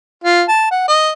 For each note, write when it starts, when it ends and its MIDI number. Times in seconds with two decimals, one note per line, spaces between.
0.24 0.43 65
0.48 0.68 81
0.71 0.87 78
0.88 1.11 75